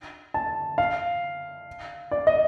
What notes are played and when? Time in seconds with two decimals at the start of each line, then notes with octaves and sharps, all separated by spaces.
0.34 A5
0.78 F5
2.11 D5
2.27 D#5